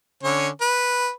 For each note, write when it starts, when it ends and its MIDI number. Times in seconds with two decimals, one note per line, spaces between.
0.23 0.49 50
0.23 0.49 61
0.23 0.49 73
0.61 1.09 71